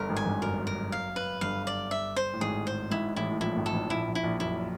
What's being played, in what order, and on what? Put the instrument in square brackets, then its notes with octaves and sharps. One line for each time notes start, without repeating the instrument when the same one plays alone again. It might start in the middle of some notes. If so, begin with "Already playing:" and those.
Already playing: [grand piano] G1 G2 [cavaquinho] A#4
[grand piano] G#1 G#2
[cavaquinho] G#5
[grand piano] G1 G2
[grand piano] F#1 F#2 [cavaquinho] A#4
[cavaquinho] A#4
F5
B4
[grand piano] G1 G2 [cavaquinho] F5
[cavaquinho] D5
E5
C5
[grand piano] A2
[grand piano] G#1 G#2 [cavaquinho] G#4
[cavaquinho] C5
[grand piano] G#1 G#2 [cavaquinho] E4
[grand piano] A1 A2 [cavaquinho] E4
[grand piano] A2
[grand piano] A#1 A#2 [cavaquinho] E4
[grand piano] G#1 G#2
[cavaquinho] A4
[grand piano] G#1 G#2
[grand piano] A#1 A#2 [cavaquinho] E4
[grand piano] A#1 A#2
[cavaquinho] E4
[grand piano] A#1 A#2
[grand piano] F#1 F#2 [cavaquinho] E4